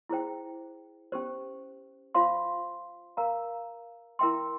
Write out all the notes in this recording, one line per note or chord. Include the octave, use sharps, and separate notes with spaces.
E4 G#4 C5 G5
C#4 G4 C5
F4 C5 F5 C6
A#4 F5 A#5
E4 A#4 E5 G5 C6